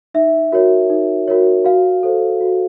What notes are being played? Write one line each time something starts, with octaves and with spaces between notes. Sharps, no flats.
D#4 E5
F#4 A#4 C#5
D#4
F#4 A#4 C#5
F#4 F5
A4 C5
F#4